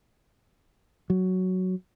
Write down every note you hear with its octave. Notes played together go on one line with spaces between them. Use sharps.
F#3